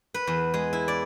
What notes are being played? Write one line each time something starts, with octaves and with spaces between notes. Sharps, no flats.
B4
E2
G#3
E4
D5